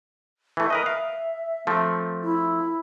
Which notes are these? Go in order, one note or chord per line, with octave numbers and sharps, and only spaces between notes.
E3 A3
A#4 B4 D#5 D#6
E5 F5
F3 A3 C4
E4